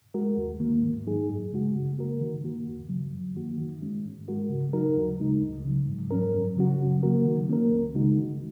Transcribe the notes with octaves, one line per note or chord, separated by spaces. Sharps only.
G#3 F#4 A#4
D#2
D#3 A#3
G#2
F#3 D#4 G#4
F#2
C#3 G#3 F#4
C#3
A#3 F#4 A#4
D#3
A#3 F#4
D#2
C#3 F#3
F#2
D#3 A#3 F#4
D#3
G#3 C#4
G#2
G#3 F#4 A#4
C#3
F#3 D#4 F#4 A#4
D#2
C#3 G#3 D#4
C#2
C#3 F#3
G#2
F#3 C#4 A#4
F#2
C#3 F#3 C#4 F#4
C#3
F#3 A#3 F#4 A#4
D#3
A#3 C#4 A#4
C#2
C#3 G#3 D#4 F#4
D#3